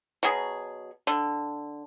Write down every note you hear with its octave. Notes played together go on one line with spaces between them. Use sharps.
B2 F#3 G#4
D3